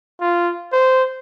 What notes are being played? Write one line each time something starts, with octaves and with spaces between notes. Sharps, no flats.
F4
C5